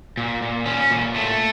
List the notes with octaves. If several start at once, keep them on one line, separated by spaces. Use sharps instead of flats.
A#2
A#2
C#4
A#2
A3